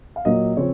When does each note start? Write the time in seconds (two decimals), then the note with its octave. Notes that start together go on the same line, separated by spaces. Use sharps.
0.16 F5
0.25 A#2 F#3 A#3 D#5
0.57 C#3 F3 C4 C#5